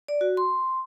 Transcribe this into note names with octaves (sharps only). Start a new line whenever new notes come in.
D5
F#4
C6